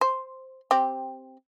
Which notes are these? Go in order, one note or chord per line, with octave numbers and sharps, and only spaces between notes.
C5
C4 G4